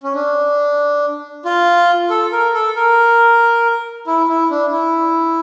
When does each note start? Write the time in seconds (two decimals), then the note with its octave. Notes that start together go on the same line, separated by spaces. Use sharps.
0.03 C#4
0.14 D4
1.45 F4
2.10 A4
2.32 A#4
2.54 A4
2.76 A#4
4.07 E4
4.28 E4
4.50 D4
4.72 E4